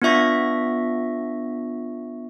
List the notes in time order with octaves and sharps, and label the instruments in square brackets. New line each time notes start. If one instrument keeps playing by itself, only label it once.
[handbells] B3 D4 F4 E5 C#6 A#6